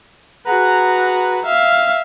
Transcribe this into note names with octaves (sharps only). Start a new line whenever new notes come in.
F#4 G#4 B4 F#5 A#5
E5 F5